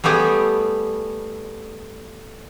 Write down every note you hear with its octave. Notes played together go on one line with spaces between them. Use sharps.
G3 A3 B3 G4 G#4